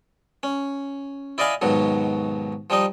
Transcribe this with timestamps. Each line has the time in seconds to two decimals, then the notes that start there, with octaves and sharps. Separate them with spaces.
0.43 C#4
1.38 E4 D5 D#5 F5 G#5 B5
1.61 D#2 G#2 B2 F#3
2.70 F3 G3 D#4 D#5